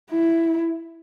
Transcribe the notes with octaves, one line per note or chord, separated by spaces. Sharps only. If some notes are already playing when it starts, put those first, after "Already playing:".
E4